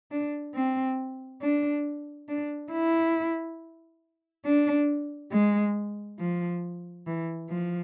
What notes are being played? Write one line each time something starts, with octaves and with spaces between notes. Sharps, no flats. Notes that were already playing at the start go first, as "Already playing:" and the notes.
D4
C4
D4
D4
E4
D4
G#3
F3
E3
F3